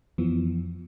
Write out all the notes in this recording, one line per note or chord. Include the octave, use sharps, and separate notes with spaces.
F2 E3 F3 B3